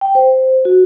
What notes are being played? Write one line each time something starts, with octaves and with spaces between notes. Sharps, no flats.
G5
C5
F#4